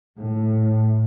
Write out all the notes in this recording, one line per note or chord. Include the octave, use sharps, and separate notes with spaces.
A2